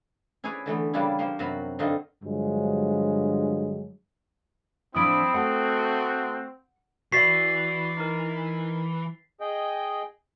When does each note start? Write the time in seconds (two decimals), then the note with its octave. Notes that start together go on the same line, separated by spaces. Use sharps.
0.44 C#4 E4 G#4 B4 C#5 D5
0.66 D3 E3 A3 B3
0.93 C#3 G3 A#3 D4 E4 F4
1.19 F3 A#3 C5
1.39 F#2 C3 F#4 F5 B5
1.79 G2 D3 C4 D#4 F4
2.24 G2 D3 F3 F#3 G#3
4.95 A2 F3 C4 D4 E4 D#6 D7
5.34 A3 F#4 F#5
7.12 E3 F#4 D5 E5 A6 B6 C7
7.97 D#4 A#4
9.41 G#4 D#5 G5